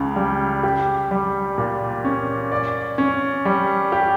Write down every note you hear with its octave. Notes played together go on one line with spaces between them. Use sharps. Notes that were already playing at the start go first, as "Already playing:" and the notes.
Already playing: C#2 C#3
G3
G4
G3
A#2
C#4
D5
C#4
G3
G4